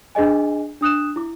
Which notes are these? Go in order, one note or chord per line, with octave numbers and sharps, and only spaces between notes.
D4 G#4 D#5 G#5
D4 D#6 F#6 E7
E4 D6